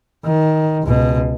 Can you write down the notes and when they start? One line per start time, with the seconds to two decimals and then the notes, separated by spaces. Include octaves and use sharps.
0.24 D#3
0.83 C#2 B2